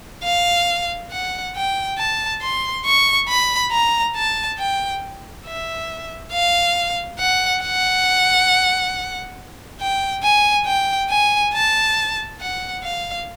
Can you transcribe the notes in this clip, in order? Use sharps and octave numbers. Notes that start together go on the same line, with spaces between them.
F5
F#5
G5
A5
C6
C#6
B5
A#5
A5
G5
E5
F5
F#5
F#5
G5
G#5
G5
G#5
A5
F#5
F5